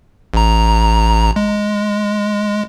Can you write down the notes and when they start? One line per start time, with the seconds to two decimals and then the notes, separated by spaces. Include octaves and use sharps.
0.34 A1 A#5
1.36 G#3